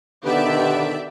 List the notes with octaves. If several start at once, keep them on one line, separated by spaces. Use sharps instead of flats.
B2 D3 D#3 B3 G4 B4 D5 E5